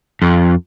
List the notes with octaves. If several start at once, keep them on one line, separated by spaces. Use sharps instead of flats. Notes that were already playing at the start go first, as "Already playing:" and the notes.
F2